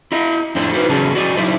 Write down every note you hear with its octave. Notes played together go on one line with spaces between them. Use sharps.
E4 D#5
F2 A2 D4 C5
D#4 E4 F#4 B4 C5
E2 C#3 F#3 C#4 G#4 A5
F#4 D5 D#5
F#3 D#4 E4 C5